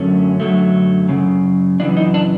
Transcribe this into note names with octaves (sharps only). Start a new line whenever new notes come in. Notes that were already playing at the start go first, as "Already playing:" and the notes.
Already playing: F#2 D3 F#3 A3 C#4
F#2 D3 F#3 A3
F#2 C#3
F#2 C#3 E3 D4
D#4
D4